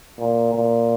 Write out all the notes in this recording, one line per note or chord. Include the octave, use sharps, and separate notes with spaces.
A#2
A#2